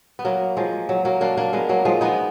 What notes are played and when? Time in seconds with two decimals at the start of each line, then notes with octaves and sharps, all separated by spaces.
0.19 B3
0.25 F#3 A#3
0.57 F3 G#3
0.89 F#3
1.05 F#3 A#3
1.21 A#3 D4
1.37 A#3 D4
1.53 G#3 B3
1.69 F#3 A#3
1.85 F3 G#3
2.01 B3 D#4